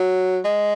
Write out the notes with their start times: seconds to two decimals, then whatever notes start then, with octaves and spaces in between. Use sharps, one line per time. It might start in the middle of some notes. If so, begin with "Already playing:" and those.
Already playing: F#3
0.45 G#3